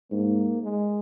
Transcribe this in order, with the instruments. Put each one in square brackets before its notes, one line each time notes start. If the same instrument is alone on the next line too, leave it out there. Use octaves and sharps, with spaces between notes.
[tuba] G#2 [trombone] A#3
[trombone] G#3